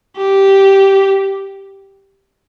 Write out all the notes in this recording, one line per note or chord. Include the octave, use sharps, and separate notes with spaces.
G4